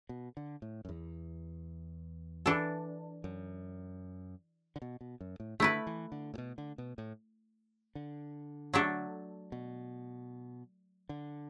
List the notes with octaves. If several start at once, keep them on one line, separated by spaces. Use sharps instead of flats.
B2
D3
A2
F#2
E2
E3 D4 A4
F#2
D3
B2
B2
F#2
A2
D3 A3 E4 B4
E3
D3
A2
B2
D3
B2
A2
D3
F#3 A3 D4 A4
B2
D3